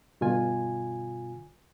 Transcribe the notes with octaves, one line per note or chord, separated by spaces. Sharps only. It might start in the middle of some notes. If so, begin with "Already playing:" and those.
G2 B2 D3 F4 G#5